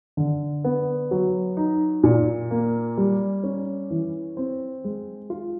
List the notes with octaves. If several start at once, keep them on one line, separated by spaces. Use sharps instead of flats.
D3
B3
F#3
D#4
A#2
A#3
G3
C#4
E3
C4
G#3
F4